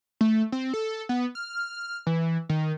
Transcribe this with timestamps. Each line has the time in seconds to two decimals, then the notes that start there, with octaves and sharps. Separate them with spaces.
0.21 A3
0.52 C4
0.74 A4
1.09 B3
1.35 F6
2.07 E3
2.49 D#3